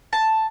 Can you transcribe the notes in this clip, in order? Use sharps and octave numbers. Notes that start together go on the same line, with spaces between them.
A5